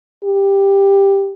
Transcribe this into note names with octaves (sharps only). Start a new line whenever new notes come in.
G4